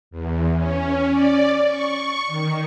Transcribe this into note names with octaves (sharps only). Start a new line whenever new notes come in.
E2
C#4
D5
C#6
D#3